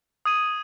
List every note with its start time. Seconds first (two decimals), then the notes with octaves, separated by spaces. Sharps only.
0.25 D#6 G#6 D#7 F#7